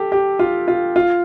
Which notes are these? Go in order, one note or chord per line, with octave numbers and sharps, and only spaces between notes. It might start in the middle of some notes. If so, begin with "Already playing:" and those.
Already playing: G4 A4
G4
F4
F4
F4